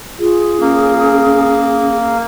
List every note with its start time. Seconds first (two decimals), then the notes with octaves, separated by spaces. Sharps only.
0.19 F4 G#4
0.61 A#3 C#4